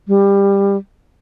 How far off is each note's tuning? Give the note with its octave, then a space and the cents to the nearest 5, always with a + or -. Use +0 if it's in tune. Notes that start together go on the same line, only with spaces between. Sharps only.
G3 +20